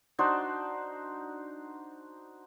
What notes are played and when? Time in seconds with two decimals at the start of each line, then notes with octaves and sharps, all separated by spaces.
0.19 D4 D#4 F#4 C5